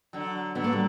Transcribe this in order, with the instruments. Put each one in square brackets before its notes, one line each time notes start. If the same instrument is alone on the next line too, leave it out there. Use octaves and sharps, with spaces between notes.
[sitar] D3 F#3
[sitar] D3 F#3 [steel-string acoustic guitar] B3
[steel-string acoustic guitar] A#3
G3